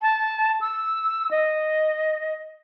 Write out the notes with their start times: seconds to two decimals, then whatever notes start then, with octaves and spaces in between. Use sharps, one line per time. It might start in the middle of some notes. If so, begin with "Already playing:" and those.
0.02 A5
0.61 E6
1.31 D#5